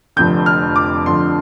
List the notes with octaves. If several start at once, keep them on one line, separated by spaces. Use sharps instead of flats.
F1 F2 D3 G6
F6
D6
F2 D3 F3 C6